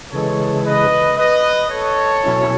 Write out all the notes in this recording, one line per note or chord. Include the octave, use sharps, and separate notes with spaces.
C#3 E3 G#3 A4 C#5
B4 D#5
B4 D#5
A4 C#5
B2 F#3 C#4 E4